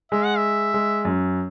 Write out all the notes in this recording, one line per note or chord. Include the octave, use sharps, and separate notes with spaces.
G#3 E5
F#5
E5
G#3
F#2